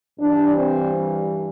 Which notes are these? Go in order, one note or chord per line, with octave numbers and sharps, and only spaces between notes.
G2 E3 G3 D4
C4